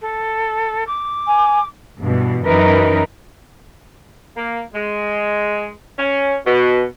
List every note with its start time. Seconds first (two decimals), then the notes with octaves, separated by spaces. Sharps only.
0.02 A4
0.87 D6
1.27 G#5
2.02 G2 B2 E3
2.47 F#2 E3 D#4 A#4 B4
4.36 A#3
4.75 G#3
5.99 C#4
6.46 B2